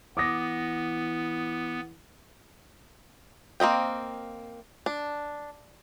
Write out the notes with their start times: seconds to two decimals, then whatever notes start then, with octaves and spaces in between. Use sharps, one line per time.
0.17 E3 B3 D6 D#6 A#6
3.60 A#3 C4 D#5 G5
4.86 D4